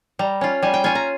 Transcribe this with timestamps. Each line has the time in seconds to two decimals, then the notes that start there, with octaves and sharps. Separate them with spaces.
0.19 G3 A#5
0.41 C#4 F4
0.62 G3 G#5
0.74 G5
0.84 C#4 F4 G#5
0.95 A#5